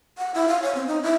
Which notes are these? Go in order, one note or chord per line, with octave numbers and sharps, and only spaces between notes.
F#5
E4
F5
C#5
C4
D#4
E4